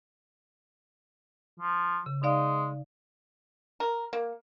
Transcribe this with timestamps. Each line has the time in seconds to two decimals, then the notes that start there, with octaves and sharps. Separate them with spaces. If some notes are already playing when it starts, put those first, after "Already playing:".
1.60 F3
2.06 C#3
2.23 G#3 D#4 D5 F5
3.80 A#4
4.13 A#3